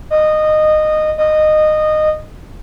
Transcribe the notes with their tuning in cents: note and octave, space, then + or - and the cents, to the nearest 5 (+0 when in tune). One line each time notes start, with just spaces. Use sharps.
D#5 -15
D#5 -15